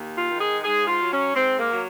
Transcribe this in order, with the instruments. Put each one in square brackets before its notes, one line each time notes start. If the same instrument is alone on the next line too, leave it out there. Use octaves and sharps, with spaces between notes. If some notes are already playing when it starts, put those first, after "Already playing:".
Already playing: [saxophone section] D#2
F4
D#3 G#3
G#4
G#2 G#4
F4
F#3
C#4
G#2 C4
A#3
F#3